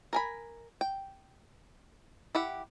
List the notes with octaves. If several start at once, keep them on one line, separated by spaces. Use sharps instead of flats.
A#4 G#5 B5
G5
E4 G4 F#5